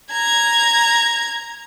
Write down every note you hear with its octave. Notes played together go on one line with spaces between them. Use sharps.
A#5 G#6